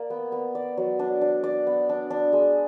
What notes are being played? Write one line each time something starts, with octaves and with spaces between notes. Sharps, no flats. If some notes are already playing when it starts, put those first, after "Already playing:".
Already playing: A#3 D5
B3
B3
D5
F#3
D4
D4
D5
B3
D4
D4
G#3